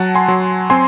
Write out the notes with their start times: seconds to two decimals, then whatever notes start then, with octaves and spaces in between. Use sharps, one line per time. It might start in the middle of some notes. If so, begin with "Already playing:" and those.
Already playing: F#3 F#5 A5
0.15 G#5 C6
0.28 F#3
0.70 C4 G#5 C6